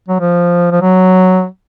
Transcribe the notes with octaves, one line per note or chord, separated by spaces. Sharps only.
F#3
F3
F3
F#3